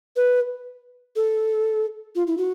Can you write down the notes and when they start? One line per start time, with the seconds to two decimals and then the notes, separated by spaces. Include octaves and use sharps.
0.16 B4
1.16 A4
2.15 F4
2.27 E4
2.38 F#4